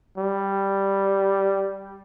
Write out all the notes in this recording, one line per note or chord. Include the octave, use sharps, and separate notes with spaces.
G3